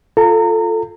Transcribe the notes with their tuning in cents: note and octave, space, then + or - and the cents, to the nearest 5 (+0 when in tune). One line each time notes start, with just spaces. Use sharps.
F4 +0 A4 +0 A#5 -30